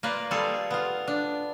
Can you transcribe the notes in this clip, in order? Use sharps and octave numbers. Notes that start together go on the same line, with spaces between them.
A#3 F4 B4 D5
G3 F4 G#4 A4
B3 F4
D4